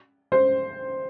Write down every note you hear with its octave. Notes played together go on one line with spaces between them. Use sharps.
C5